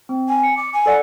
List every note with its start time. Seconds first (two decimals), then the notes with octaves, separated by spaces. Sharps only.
0.09 C4
0.28 G#5
0.43 C#7
0.57 D6
0.73 G#5
0.86 A4 D5 F#5